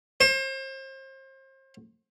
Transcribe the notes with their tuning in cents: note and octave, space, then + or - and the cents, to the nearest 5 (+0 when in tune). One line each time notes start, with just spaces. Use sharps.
C5 +35